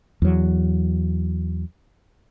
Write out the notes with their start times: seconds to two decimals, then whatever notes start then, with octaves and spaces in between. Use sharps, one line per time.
0.22 E2 F#3